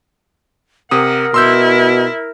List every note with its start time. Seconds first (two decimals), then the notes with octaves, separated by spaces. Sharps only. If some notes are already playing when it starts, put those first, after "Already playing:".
0.91 C3 A#4 F#5 D#6
1.34 B2 E4 C6 E6 G6